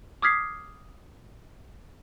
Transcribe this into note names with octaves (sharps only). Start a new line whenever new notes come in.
D6 D#6 F6 G#6 B6 C7